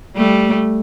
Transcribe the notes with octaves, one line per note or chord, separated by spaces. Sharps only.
G3 A3